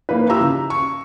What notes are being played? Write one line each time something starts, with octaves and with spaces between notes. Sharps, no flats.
A#3 D#4 B4
E4 F4 G4 A#5 E6
C#3
C#6